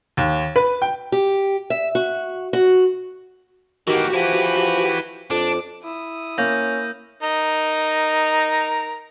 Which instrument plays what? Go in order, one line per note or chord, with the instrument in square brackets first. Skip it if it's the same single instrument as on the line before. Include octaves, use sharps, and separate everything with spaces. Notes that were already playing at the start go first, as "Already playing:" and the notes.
[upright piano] D#2
B4
G5
[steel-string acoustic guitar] G4
E5
F#4
F#4
[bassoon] D#3 [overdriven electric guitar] E3 A#3 [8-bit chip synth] F#4 G4
[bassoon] F3 [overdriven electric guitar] E4 B4
[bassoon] F2 [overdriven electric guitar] D4 [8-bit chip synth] D6
[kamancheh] E4 D#6
[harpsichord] A#3 [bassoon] C#4 [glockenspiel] G6 A#6
[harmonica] D#4 A#4